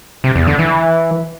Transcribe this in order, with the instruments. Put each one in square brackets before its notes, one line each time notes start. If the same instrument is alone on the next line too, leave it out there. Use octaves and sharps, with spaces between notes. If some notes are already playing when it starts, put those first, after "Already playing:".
[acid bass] C3
E2
D3
E3